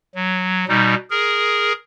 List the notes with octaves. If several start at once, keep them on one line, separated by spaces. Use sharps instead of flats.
F#3
B2 G3 D#4
G#4 A#4